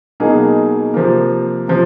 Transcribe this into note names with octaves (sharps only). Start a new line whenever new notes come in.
B2 F#3 A#3 D#4 G#4
C3 F3 A#3
C3 F3